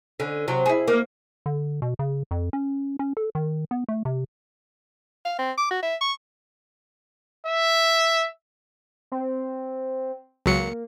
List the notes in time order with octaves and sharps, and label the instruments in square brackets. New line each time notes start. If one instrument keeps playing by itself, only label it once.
[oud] D3 C#4
C3 F#3
E4 G#4
A#3
[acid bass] D3
B2
C#3
F2
C#4
C#4
A4
D#3
B3
A3
C3
[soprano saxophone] F5
C4
D6
F#4
E5
C#6
[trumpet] E5
[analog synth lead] C4
[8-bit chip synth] C#2 F#3 C#7 [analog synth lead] A#3